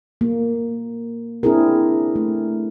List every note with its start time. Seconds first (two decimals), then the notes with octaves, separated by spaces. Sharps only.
0.21 A#3
1.43 C4 D4 E4 G#4 A#4
2.16 A3